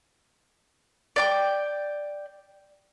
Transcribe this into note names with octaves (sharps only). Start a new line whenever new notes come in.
D5 G5 D6